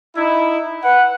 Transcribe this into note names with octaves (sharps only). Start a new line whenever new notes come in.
D#4 E4
B4 F#5